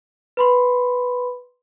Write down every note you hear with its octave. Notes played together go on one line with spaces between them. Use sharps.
B4 B5 C6